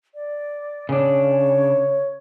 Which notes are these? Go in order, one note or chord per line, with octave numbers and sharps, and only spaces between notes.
D5
C#3 D4 C#5